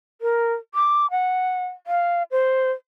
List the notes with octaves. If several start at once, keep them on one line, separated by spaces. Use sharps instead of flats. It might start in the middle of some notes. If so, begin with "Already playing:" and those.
A#4
D6
F#5
F5
C5